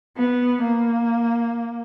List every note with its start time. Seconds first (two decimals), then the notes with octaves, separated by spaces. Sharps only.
0.17 B3
0.63 A#3